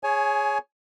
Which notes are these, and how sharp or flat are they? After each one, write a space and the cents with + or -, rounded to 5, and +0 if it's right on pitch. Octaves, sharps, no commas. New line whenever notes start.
G#4 +0 C#5 +0 G#5 +25